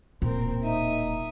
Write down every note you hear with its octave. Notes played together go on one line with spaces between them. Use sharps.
D1 A#2 C4 A#4
D#4 E5 D#6